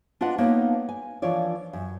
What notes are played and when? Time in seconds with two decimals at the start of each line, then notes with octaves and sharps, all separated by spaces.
0.21 D4 F4 B4 D#5 F#5
0.38 A#3 B3 D#4 B4 C#5
0.89 G#5
1.22 E3 F3 D4 F4 C#5 D5
1.73 F#2